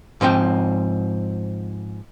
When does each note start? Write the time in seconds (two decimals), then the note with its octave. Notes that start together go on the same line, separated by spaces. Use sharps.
0.21 G#2 F3 C4 G5